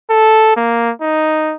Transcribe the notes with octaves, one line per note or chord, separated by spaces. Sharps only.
A4
A#3
D#4